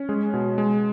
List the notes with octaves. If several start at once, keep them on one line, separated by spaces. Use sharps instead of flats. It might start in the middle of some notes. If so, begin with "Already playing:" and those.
Already playing: C#4
G#3 G#4
B2
G#3